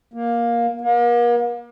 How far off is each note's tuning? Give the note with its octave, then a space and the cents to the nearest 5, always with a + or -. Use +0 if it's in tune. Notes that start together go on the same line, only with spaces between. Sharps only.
A#3 +10
A#3 +40